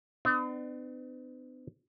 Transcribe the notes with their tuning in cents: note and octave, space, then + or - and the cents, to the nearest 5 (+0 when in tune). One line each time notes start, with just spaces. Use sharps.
B3 +45 D4 +40